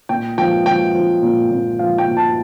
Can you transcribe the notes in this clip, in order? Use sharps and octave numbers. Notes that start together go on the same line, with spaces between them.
A#2 G5
F3 G5
F3 G5
F3
A#2
A#2
F3 F5
G5
A#2
A5